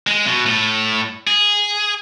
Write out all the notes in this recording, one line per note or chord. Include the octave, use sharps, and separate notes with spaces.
G#3
B2
A2
G#4